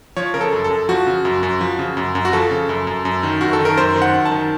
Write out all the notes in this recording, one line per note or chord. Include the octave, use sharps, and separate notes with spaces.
F3 C#5
C#3 A#4
A4
F#2
A4
F#2
F3 F#4
C#3
F#2
F#2
F3
C#3
F#2
F#2
F#4
F3 A4
C#3
F#2
F#2
F#2
D#3
F#2 F#4
A4
D#3
A#4
F#2 C5
D#3
F#5
F#2
A5
D#3